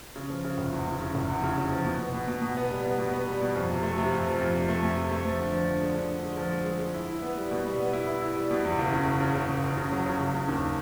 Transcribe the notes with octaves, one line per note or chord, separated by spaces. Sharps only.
C#3
F3
C#3
F1
E2
E2
C#3
F1
E2
C#3
C#3
F3
B2
B3
B2
B2
B2
B3
G3
B3
B2
B3
G3
B2
F2
C3
A3
C3
F2
F3
F2
C3
A3
F2
C3
A3
F3
D3
F3
D3
G#3
D3
D3
G#3
F3
G#3
G#3
G#3
E4
E4
B3
G3
B2
G3
B3
E4
E4
E4
G3
B2
E2
F#1
C#3
C#3
C#3
C#3
F#1
F#1
C#3
F#3
C#3
F#1
C#3
D#2